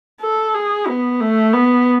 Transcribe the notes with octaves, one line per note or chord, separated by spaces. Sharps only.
A4
G#4
B3
A3
B3